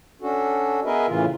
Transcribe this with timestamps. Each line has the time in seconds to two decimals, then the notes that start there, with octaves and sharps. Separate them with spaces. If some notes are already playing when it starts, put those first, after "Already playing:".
0.22 C#4 D4 F#4 A4
0.85 B3 G#4 A#4 B4 D#5 E5
1.08 A2 C#3 E3 F4